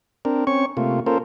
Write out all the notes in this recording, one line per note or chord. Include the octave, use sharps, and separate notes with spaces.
C4 D4 A#4
C4 C#4 C#5 C#6
C3 A3 A#3 F4
A#3 C#4 F4 A4 A#4 C5